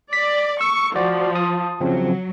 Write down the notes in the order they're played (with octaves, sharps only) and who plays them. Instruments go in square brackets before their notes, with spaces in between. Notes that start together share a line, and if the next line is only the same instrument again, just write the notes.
[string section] D5 [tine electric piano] B6
[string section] C#6 [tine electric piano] E6
[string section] F3 [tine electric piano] F#4 D5
[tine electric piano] A5 D#6
[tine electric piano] C#3 F3 C4 [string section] F#3